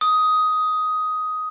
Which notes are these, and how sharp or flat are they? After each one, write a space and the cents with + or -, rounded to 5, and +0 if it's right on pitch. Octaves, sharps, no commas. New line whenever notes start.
D#6 +10